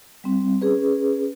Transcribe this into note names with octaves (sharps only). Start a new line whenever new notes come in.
G3 C4
C#4 G#4 B4